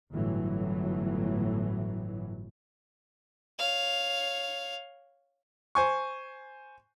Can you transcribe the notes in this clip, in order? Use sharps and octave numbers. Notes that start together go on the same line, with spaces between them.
G1 A2 E3 F#3
C#5 F5
C5 G#5 C#6